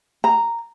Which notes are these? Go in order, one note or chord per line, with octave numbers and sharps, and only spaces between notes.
A#5